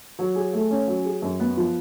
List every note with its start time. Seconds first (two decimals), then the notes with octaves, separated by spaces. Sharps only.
0.19 F#3
0.35 G#4
0.53 A3
0.71 C#4
0.87 F#3
1.05 G#4
1.22 F#2
1.40 B3
1.57 F3